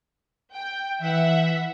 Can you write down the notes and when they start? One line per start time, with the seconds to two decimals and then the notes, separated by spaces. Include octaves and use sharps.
0.52 G5
1.00 E3 E5 F#5